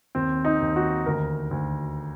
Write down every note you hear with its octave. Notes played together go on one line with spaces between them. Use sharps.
D#2 C4
D#4
D#2
F#4
D2 A#4
D2